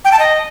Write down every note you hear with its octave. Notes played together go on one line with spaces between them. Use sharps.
G5
A5
D#5